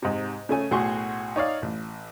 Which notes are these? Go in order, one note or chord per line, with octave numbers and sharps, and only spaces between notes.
G#2 C3
C#3 A3 G#5
B1 A2 F#4 G#4 C6 C#6
D#4 C#5 D5 F5
A1